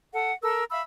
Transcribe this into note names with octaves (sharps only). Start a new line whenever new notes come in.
A4 F#5
A4 A#4 E6
E5 F5 B5 E6